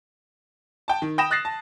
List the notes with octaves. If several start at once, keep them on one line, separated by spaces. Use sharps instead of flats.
G5 A5
D#3
G5 B5 D#6 A#6 E7
D#6 F#6 A6 A#6 C7
A5